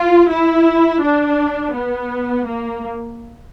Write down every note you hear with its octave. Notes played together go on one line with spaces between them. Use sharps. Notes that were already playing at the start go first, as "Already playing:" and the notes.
Already playing: F4
E4
D4
B3
A#3